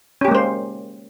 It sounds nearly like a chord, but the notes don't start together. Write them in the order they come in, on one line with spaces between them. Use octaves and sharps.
C#4 G4 A#3 G#3 C5